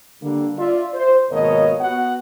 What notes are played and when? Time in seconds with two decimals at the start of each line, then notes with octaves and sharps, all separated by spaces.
0.22 D3 G3 A#3
0.59 F4 D5 E5
0.94 C5
1.31 G#1 B2 A#3 A#4 C#5 D#5
1.80 B3 F#4 F#5